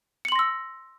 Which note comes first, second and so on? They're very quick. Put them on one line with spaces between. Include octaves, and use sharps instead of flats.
C#7 F#7 C6 A#6 E6